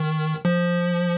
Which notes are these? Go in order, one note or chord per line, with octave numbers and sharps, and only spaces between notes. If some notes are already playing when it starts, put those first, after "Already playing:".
Already playing: D#3
F3